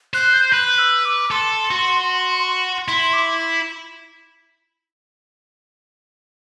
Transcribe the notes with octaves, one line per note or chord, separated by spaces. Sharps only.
C5 F#6
G6
B4 F#6
E6
D6
A4 C6
F#4
E4 C6
C6
D6